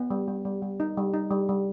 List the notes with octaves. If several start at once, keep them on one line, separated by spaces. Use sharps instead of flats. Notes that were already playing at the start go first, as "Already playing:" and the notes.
Already playing: B3
G3
G3
G3
G3
D#4
G3
D#4
G3
G3